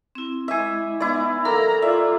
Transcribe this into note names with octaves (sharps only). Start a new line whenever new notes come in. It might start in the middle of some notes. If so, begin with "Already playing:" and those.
C4 E4
G#3 E4 D#5 E5 G#5 D6
B3 D#4 E4 D5
A#3 A4 A#5
F4 D5 E5